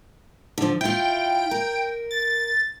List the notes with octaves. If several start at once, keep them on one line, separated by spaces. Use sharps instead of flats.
D3 F3
E4 F4 G5
A#4
A6